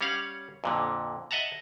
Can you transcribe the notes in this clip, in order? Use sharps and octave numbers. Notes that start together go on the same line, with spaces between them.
G3 C#4 C#5 F5 F#5
F2 A#2 D3
D#5 E5 F#5 A5 A#5